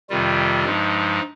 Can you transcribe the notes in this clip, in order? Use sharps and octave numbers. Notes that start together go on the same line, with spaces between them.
F2 C3 D#3 G3 F4
G2 F3 G#3 D#4